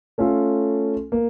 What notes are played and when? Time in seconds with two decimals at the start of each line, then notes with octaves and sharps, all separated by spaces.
0.18 A3 C#4 F4 A4
1.12 A#3